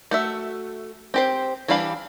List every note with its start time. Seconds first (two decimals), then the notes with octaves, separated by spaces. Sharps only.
0.11 A3 F#4 E5
1.14 C4 G4 C5
1.68 E3 G3 D4 F5 B5